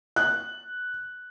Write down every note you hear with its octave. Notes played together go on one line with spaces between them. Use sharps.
F#6